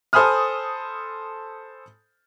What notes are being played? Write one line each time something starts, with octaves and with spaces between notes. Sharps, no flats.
A4 C5 G#5 B5 D#6 F6